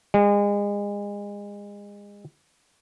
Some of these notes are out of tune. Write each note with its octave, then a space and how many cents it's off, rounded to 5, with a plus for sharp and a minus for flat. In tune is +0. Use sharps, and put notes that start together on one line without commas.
G#3 -30